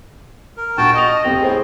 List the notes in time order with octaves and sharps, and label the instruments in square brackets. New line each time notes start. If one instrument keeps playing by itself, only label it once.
[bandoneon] A#4
[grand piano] A#1 [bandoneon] F#4 G5 A5
[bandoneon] D#5 [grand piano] C#6 D#6 F7
[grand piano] F1 C4 G5
[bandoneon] A2 [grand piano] G#4 C5